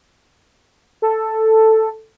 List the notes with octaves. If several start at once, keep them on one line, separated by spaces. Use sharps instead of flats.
A4